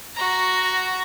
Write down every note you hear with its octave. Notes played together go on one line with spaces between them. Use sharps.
F#4 A#5